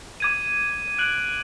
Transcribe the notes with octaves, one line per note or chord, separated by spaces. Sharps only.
D6 G#6 D#7
F#6 D7 F#7